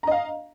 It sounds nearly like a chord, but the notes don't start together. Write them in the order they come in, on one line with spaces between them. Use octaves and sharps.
A#5 D#5 F5